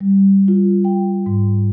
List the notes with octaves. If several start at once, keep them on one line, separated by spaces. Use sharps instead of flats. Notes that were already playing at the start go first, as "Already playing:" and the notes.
G3
F4
G5
G#2